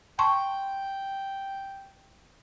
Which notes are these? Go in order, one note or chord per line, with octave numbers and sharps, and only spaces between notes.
G5 A5 C6 C#6